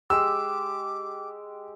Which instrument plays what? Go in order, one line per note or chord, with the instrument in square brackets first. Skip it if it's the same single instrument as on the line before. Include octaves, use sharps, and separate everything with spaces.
[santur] G#3 G4 [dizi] D6 [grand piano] E6